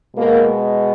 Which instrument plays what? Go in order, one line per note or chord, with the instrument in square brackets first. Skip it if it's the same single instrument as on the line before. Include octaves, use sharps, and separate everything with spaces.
[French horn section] B2 G#3 A#3